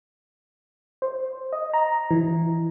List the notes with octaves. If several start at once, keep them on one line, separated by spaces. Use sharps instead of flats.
C5
D#5
A#5
E3